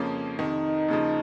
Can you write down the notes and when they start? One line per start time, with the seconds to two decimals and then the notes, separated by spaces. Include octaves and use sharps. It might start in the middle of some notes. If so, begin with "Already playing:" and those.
Already playing: F2 C#3 F3 A#3 C#4
0.38 F2 C3 D#3 D#4
0.88 D#2 C#3 F3